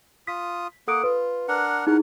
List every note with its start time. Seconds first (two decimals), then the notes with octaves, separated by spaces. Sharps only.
0.27 F4 D#6 B6
0.88 A#3 A4 F#5 D#6 D7
1.04 F4 B4
1.48 D4 A#4 F#5
1.87 D#4 E4 G#4 A#4 B4 F#5